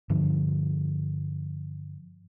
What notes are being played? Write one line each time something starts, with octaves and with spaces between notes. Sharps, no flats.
G2 D3 F3